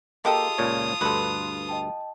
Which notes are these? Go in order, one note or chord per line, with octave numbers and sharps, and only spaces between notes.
G#3 A#3 F4 G4 A4 A5 D#6
C#2 A#2 C#5
D2 G2 A4 B4 C6
D#5 G5 A5